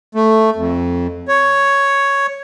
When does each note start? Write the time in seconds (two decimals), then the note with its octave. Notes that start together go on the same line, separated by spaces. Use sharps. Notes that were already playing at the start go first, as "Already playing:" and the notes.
0.15 A3
0.56 F2
1.28 C#5